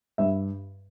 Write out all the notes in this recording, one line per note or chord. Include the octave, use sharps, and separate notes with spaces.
G2 E5